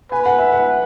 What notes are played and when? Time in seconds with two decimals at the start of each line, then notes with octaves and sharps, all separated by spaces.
0.12 B4 G#5
0.26 F#5
0.38 E5
0.52 F#5